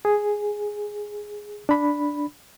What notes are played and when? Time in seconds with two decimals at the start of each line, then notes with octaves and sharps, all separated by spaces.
0.05 G#4
1.69 D4 B5